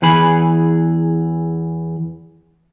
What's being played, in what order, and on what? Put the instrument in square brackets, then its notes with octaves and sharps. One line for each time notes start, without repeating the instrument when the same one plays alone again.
[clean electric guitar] E2 E3 G#4 B5